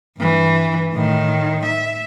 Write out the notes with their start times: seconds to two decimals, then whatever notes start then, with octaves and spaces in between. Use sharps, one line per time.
0.18 G2 E3
0.94 A2 D#3
1.66 E5